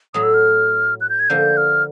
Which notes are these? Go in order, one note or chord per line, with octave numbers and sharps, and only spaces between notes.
A2 F#3 A3 D#6
E6
F6
F#6
G6
G#6
D3 F3 A#3 G6
F6